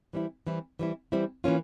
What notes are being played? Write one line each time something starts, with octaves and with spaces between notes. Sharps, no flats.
E3 G3 C4 E4
E3 G3 C4 E4
E3 G3 C4 E4
E3 G3 C4 E4
E3 A#3 C#4 F4